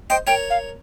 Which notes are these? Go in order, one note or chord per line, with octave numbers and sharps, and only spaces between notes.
C5 D#5 G5
A#4 C#5 G5
F5